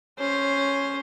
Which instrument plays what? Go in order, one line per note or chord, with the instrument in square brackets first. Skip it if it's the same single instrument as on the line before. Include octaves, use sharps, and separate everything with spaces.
[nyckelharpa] C#4 C5